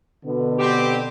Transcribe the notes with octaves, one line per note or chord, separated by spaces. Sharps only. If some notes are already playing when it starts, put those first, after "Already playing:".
B2 D3 B3
C4 G4